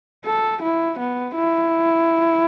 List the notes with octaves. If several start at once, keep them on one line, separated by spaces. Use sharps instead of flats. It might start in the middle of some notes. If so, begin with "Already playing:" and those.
A4
E4
B3
E4